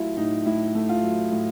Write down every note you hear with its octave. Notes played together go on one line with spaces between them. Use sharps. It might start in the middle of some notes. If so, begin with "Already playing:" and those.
Already playing: F#3 A3 E4 F4
A2 D#4
A2 E4
A3
F4
F#3
A2